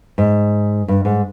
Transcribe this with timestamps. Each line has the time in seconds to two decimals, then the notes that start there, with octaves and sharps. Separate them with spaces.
0.18 G#2
0.88 G2
1.05 G#2